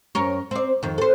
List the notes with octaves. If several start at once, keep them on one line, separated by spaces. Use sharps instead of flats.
F#2 A#4 C#5
C4 D5
F2 D#3
A4 C5